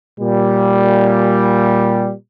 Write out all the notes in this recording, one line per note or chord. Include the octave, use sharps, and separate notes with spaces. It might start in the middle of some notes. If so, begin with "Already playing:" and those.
A#2 G3